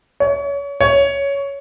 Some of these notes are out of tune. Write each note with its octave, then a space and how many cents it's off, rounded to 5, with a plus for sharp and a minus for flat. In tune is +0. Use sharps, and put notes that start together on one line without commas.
C#5 +30
C#5 +10